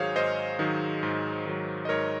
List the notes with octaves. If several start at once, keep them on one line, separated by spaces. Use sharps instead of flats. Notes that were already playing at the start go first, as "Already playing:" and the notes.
Already playing: G#2 D#3 F#3 G#4 C5 C#5 F5
G#2 C5 D#5
D#3 F#3
G#2
D#3 F#3
D#5
G#2 A#4 C#5